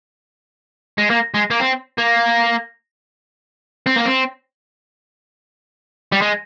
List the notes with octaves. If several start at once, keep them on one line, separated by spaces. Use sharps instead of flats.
G#3
A#3
G#3
A#3
C4
A#3
C4
A#3
C4
G3
G#3